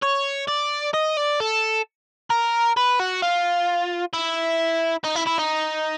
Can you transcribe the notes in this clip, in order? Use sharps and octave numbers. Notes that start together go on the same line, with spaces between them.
C#5
D5
D#5
D5
A4
A#4
B4
F#4
F4
E4
D#4
E4
E4
D#4